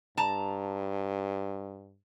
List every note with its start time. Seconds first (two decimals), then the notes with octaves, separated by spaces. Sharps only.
0.17 G2 A5 A#5